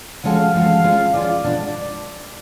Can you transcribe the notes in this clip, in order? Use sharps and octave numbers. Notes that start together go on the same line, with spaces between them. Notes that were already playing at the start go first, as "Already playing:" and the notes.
F3 G#3 C#4 F#4 A4 F5
F3 G#3 C#4 F#4 A4
G#3 C#4 F4
G#3 C#4 F4 D5
B2 G#3 D4